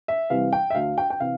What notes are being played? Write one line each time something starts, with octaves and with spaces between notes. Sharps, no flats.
E5
C3 E3 G3 F5
G5
E5
D2 F5
G5
G5
C3 E3 F5